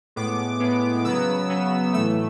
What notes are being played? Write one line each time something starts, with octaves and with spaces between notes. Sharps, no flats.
A2 G#3 B3 D6
A2 G#3 B3
C#3 F#3 B3 E6
C#3 F#3 B3
A2 E3 A3 E6